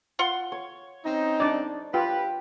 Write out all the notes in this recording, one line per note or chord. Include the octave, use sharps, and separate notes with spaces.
F4 F#5 C6
C#5
C4 C#4 D#4
D4 D5
F4 G4 B4 G5